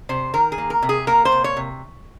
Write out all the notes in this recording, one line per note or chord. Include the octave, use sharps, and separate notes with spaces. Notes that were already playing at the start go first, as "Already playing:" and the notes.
C3 C5
D#3 A#4
G#4
A#3
A#4
C3
G#4
A#3 A#4
C5
C3
C#5
C3